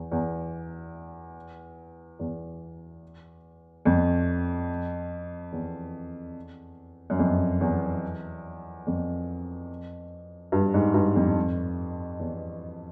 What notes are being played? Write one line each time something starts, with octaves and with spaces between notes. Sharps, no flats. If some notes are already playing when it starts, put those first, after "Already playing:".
Already playing: E2
E2
E2
F2
E2
F#2
F2
E2
F2
G2
G#2
G2
F2
E2